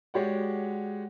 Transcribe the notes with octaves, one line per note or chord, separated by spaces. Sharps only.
G#3 F#4 G4 C#5 D5 F#5